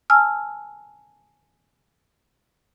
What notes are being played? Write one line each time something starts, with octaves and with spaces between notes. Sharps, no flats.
G#5 A5 E6 F6